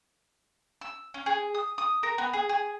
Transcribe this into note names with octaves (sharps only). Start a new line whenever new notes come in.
E6
C#4
G#4
D#6
D#6
A#4
B3
G#4
G#4